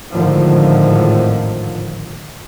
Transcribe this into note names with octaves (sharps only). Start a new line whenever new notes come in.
G#1 F2 A2 D3 D#3 F3